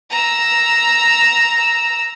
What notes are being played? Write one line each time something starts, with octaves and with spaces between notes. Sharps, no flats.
A#5 E6